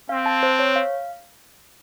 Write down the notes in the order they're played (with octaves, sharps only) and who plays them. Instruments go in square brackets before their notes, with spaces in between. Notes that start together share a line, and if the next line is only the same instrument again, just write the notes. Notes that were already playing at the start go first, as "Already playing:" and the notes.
[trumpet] C4 [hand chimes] F5
[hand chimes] A5
C5
C#5
F5